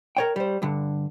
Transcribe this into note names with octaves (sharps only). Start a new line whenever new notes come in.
A#4 C#5 G5
G3 C5
G2 D3